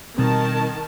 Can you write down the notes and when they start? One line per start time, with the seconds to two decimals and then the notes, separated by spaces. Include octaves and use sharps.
0.18 B2 D#3 G3 C4 A#4 A5